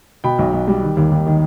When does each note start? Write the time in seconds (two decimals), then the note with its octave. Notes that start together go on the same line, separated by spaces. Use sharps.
0.24 B2 G5 B5
0.39 B1
0.53 B1
0.68 G3
0.83 D#3
0.97 D#2
1.12 D#2
1.26 D#3